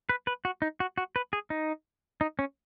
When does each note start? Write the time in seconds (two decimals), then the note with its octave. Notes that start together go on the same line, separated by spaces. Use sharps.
0.09 B4
0.27 B4
0.45 F#4
0.62 D#4
0.80 F#4
0.98 F#4
1.16 B4
1.33 G#4
1.50 D#4
2.21 D#4
2.39 C#4